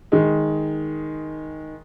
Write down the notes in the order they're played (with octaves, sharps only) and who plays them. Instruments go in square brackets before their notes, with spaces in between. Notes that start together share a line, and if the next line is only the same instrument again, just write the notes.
[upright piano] D#3 G#3